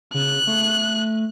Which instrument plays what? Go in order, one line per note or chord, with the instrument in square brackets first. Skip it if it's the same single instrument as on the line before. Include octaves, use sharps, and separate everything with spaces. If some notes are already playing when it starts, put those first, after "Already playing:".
[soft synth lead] C#3 [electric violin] F#6
[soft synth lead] A3